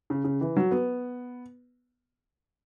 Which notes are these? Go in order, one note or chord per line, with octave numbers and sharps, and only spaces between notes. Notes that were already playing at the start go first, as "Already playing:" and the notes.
C#3
C#3
E3
F#3
B3